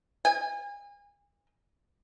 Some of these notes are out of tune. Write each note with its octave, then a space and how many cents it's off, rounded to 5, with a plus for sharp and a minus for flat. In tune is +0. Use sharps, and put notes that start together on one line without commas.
G#5 -35